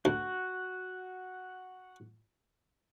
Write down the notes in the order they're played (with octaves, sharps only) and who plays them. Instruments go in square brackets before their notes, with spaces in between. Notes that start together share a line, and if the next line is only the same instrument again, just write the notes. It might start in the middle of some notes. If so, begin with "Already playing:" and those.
[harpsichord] D2 [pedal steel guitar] F#4 F#5